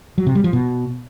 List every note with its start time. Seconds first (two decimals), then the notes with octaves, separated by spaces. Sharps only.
0.18 F#3
0.27 C3
0.35 G3
0.44 F3
0.53 B2